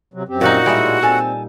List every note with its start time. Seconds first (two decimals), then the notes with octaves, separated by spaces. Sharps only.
0.14 C3 F#3
0.28 F#2 C4 G4
0.41 A#2 D#4 F#4
0.66 A2 G3 G#3 D#5 E5
1.02 C4 A4 G#5 A5